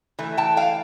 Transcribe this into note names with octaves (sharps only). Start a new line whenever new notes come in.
E3 A3
G5 A5
F5 G5